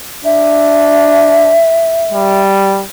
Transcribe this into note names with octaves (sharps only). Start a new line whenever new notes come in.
D4 E5
G3